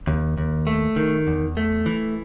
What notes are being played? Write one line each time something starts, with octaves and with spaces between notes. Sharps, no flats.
D#2
D#2
A3
D#3
E2
A3
E3